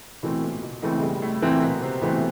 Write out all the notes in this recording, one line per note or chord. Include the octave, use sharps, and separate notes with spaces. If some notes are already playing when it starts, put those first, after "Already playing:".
B2 E3 A3 C4
A#2
A#2
B2
C#2 C#3 E3 A3 C4
G#3
G2 G3
A2 A3
A#2 E3 A3 A#3 C4
B2 B3
C3 C4
B2 E3 A3 B3 C4